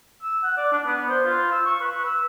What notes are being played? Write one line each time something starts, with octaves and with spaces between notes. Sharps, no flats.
E6
F#5
D5
D4
B3
C5
F4
E6
C#6
B4
E6